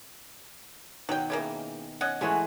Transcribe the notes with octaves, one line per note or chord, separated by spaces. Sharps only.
B2 D#3 F#3 G5
C#3 E3 A#3
C#4 D#5 F#5
C#3 E3 G#3 A3 F#4